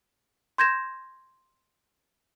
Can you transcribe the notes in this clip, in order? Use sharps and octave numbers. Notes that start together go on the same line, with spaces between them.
C6 G6 G#6 A#6 E7